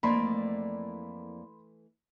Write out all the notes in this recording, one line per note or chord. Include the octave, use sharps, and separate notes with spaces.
F2 E3 A3 A#3 D5 B5 C6